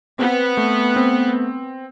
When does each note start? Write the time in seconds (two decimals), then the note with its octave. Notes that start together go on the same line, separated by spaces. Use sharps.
0.19 B3 C4
0.57 A3
0.96 C4